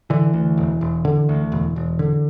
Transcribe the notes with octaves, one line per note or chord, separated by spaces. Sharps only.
D3 E3
D2
E1
E1
D3
D2
E1
E1
D3